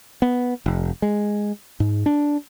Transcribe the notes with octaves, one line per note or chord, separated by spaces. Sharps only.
B3
F1
G#3
G#2
D4